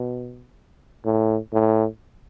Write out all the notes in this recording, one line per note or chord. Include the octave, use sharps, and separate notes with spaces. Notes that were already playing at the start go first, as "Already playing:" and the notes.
Already playing: B2
A2
A2